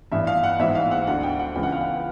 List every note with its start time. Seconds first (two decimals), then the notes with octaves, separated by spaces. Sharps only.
0.12 A1 G2 E3 E5
0.27 F5
0.43 F#5
0.59 A#1 G#2 E3 E5
0.75 F5
0.91 F#5
1.07 D2 D3 F#5
1.23 G5
1.39 F#5
1.55 C#2 C#3 E3 G5
1.63 F#5
1.72 F5
1.81 F#5